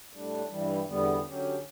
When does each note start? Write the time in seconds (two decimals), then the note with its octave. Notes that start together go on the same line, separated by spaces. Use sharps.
0.11 A2 G3 D4
0.50 G2 E3 G3
0.87 E2 D3 G3 B3
1.26 F#2 D3 F#3 C#4 G4